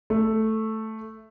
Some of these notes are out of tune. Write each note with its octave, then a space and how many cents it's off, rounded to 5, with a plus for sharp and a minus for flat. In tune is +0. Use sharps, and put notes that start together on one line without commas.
A3 +0